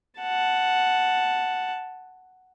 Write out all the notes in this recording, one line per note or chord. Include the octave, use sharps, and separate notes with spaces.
F#5 A5